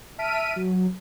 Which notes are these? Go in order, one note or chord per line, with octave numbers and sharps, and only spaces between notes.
E5 A5 F6 B6 D7 D#7
F#3